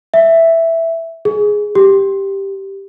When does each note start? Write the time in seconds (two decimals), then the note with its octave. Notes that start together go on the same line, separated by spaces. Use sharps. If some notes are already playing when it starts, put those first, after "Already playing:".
0.14 E5
1.25 G#4
1.75 G4